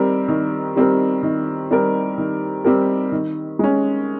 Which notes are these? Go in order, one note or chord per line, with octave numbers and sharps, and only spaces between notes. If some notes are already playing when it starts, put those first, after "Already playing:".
Already playing: D#3 G3 C4 G4 A#4
D#3
G3 C4 G4 A#4
D#3
G3 C4 G4 A#4
D#3
G3 C4 G4 A#4
D#3
G#3 C#4